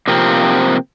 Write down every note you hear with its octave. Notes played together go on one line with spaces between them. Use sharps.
C3 F3 A#3 C4